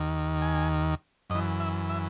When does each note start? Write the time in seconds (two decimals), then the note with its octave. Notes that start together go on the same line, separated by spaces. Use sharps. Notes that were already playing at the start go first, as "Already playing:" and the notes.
Already playing: D#2 D#3
0.42 G#5
1.30 F#2 D#5
1.35 E3
1.60 E5
1.90 E5